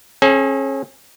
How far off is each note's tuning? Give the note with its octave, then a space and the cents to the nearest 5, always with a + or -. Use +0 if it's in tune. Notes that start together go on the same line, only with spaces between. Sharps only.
C#4 -35 G#4 +40